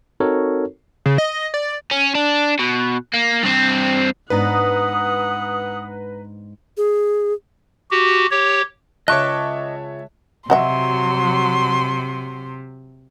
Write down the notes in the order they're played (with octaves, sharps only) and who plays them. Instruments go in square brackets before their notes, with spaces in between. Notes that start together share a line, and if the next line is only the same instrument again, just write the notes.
[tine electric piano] C4 D#4 F#4 A4 A#4 C#5
[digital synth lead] C#3
D#5
D5
[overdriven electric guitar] C#4
D4
B2
A#3
G2 C4
[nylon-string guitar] G#2 B3 D4 [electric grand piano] B4 A#5 [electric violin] F#5 [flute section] D#6
[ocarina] G#4
[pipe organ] F#4 G4
G4 C#5
[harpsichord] C#2 [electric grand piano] C#5 E5 A5 [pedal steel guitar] D#5 C#6 D6 [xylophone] F#6
[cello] C3 [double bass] F#3 [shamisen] F#4 D#5 E5 [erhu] C6